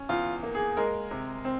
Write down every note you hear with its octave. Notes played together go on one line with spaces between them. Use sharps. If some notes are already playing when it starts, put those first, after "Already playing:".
Already playing: C#4
E2 F4
A#3
G#4
G#3 A#4
C3
C4